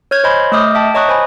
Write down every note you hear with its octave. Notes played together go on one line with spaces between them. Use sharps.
C#5 F6 G6 G#6
C5 C#5 D#5 G#5 B5 C6
A3 D#5 D6 D#6 F6 G6
E5 G5 A5
C#5 D#5 A#5 C#6 D#6 F#6
C5 G#5 B5 C#6